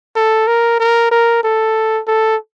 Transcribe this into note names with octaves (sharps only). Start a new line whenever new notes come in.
A4
A#4
A#4
A#4
A4
A4